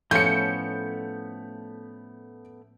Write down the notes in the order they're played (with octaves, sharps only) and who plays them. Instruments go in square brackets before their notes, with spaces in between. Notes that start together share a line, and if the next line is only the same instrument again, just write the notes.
[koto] A2 F3 C#4 [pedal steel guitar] A3 B3 [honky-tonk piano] G6 C#7